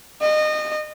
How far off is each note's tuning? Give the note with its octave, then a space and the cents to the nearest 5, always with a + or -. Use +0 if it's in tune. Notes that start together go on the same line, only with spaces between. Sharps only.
D#5 -25